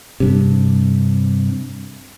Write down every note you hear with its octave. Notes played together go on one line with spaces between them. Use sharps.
G2 C3